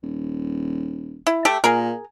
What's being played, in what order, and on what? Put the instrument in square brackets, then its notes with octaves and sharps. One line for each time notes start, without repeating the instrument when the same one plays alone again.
[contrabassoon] D#1
[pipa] E4
A3 G4 A4
[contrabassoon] A#2 [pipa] G#4 A#4